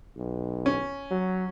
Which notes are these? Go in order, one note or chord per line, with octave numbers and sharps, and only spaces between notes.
B1
C#4
F#3